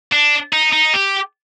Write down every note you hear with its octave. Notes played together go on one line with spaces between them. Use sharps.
D4
D#4
D#4
G4